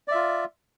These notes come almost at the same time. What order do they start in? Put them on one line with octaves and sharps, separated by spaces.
D5 E5 F4